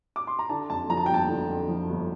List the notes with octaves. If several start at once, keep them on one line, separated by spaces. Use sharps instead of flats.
D6
C6
A#5
D3 A5
F2 A5
F3 A#5
A5
G5
G1 A5
D3
F2
F3
G1